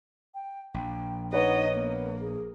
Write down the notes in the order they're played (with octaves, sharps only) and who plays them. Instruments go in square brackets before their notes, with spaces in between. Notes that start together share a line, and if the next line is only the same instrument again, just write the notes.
[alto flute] G5
[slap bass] A#1 [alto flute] G5
[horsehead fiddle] D#4 D#5 [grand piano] B4 C#5 [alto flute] F#5
[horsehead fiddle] A#3 [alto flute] B3
[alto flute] G#4